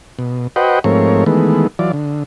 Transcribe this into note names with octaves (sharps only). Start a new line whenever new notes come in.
B2
F#4 B4 C5 D#5 F#5 G5
G#2 F3 A3 C4 A#4 C#5
D#3 E3 G#3 A3 B3
E3 F#3 F4 D5
D3